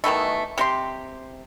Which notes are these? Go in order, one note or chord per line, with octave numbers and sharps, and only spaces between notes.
B2 D#3 E3 A3
C3 G4 C6